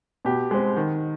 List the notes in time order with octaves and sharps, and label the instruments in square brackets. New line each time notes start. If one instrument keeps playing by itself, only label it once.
[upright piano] B2 G4
G#3 C4
D#3